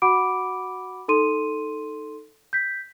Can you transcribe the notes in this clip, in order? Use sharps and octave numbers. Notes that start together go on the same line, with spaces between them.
F#4 F#5 B5 D6 D7
D#4 A4 C6 D#7
G6 B6